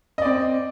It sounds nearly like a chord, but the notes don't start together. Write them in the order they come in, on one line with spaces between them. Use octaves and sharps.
D#5 D5 C4